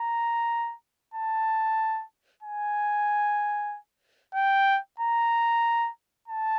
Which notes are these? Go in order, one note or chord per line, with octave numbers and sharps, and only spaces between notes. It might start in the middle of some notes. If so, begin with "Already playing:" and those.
Already playing: A#5
A5
G#5
G5
A#5
A5